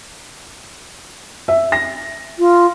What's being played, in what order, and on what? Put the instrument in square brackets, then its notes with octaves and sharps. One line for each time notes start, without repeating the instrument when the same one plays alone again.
[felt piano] E5
A#6
[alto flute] F4